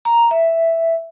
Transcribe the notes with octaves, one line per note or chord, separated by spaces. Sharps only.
A#5
E5